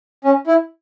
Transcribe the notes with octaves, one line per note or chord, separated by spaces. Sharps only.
C#4
E4